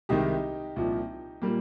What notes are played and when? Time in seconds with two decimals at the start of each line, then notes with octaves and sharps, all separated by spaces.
0.09 C2 C3 D#3 G#3 D#4 G4
0.76 C2 A#2 F3
1.42 A#2 G3 A#3